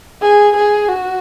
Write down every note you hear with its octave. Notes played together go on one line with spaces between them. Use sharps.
G#4
G#4
F#4